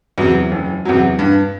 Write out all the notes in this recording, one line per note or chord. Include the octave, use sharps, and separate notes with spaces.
E2 C3 F#3
F#1
E2 C3 F#3
G2